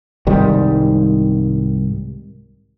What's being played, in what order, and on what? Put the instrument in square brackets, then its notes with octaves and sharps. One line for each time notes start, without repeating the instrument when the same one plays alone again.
[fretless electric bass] C2 G#2 D#3 G3